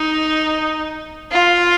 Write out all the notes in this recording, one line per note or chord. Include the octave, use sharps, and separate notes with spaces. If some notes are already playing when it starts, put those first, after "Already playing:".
Already playing: D#4
F4